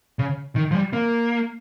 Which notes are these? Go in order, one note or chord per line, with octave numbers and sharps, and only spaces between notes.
C#3
D#3
F3
G3
A#3